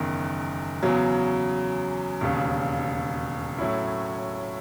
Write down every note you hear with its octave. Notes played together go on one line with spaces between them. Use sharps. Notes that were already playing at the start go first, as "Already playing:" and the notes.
Already playing: F#1 E2 D#3
E2 C#3 F#3
E1 D#2 C#3
A2 F#3 C#4 E4